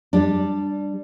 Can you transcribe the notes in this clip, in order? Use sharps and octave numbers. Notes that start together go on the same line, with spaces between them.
G3 D4